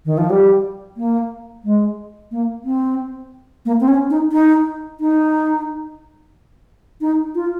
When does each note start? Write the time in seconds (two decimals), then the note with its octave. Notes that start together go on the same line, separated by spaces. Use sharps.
0.05 D#3
0.18 F3
0.30 G3
0.97 A#3
1.64 G#3
2.31 A#3
2.64 C4
3.65 A#3
3.81 C4
3.88 C#4
4.10 D#4
4.32 D#4
5.00 D#4
7.01 D#4
7.35 F4